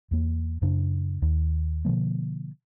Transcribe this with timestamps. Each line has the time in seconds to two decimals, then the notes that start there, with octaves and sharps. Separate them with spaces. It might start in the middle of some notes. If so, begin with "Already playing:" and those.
0.11 E2 A#3
0.62 F#2 C#3 D4
1.22 D#2
1.85 B2 D3 F3 A#3